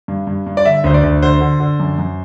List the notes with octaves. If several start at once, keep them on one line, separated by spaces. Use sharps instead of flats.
G2
G2
G2
D5
D3 E5
D2 C5
D5
D2
D3 C5
D3
D3
F#2
F#2